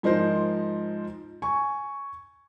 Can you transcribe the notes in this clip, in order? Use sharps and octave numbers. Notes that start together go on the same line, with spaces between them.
G#2 F3 D#4 A#4 C5 C6
G#5 C#6